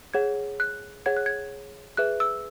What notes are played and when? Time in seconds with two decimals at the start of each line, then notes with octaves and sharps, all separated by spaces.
0.14 G#4 C#5 F#5 G#6
0.60 F#6
1.06 G#4 C#5 F#5 G#6
1.17 F#6
1.26 G#6
1.97 G#4 B4 E5 F#6
2.20 E6